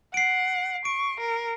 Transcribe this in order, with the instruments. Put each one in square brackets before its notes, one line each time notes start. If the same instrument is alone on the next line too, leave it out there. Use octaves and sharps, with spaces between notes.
[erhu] F#5 [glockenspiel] C7 D7
[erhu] C#6 [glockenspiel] D7
[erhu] A#4